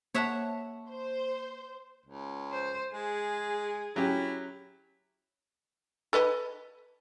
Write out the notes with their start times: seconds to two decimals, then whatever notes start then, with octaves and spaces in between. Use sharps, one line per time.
0.15 A#3 C#5 E5 F#5 A5
0.90 C5
2.06 C#2
2.52 C5
2.93 G#3 G#4
3.96 F#3 C#4 E4 G4
6.13 A4 B4 D#5